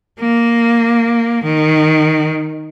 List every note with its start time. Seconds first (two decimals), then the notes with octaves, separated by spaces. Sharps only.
0.19 A#3
1.44 D#3